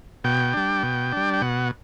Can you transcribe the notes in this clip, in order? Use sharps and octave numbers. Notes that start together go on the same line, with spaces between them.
B2 G5
G3 D4
B2
G3 D4
G5
B2 F#5